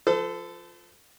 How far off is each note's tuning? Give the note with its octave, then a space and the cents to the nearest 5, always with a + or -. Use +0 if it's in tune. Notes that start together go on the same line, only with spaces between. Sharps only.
F3 +5 A4 +0 C5 -45